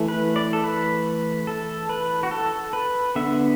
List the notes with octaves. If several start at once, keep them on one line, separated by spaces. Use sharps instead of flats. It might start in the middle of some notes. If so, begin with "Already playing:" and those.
Already playing: E3 A3
B4
D5
A4
B4
A4
B4
F#4
A4
B4
D3 B3 E5